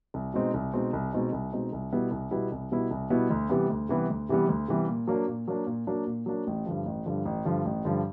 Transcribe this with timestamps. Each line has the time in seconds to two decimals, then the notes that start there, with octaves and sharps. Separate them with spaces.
0.14 C2
0.34 B2 G#3 C4 D#4
0.54 C2
0.73 B2 G#3 C4 D#4
0.93 C2
1.12 B2 G#3 C4 D#4
1.32 C2
1.52 B2 G#3 C4 D#4
1.73 C2
1.92 B2 G3 B3 E4
2.11 C2
2.31 B2 G3 B3 E4
2.52 C2
2.71 B2 G3 B3 E4
2.91 C2
3.10 B2 G3 B3 E4
3.30 D2
3.49 C3 E3 G3 B3
3.70 D2
3.89 C3 E3 G3 B3
4.10 D2
4.29 C3 E3 G3 B3
4.48 D2
4.68 C3 E3 G3 B3
4.88 A#2
5.07 F#3 A#3 D4
5.28 A#2
5.48 F#3 A#3 D4
5.67 A#2
5.87 F#3 A#3 D4
6.07 A#2
6.26 F#3 A#3 D4
6.47 A1
6.66 G2 D3 F3
6.86 A1
7.06 G2 D3 F3
7.25 A1
7.45 G2 D3 F3
7.65 A1
7.85 G2 D3 F3